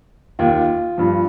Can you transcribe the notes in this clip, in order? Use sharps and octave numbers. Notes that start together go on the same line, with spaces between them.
D#2 D#3 F4
G2 F3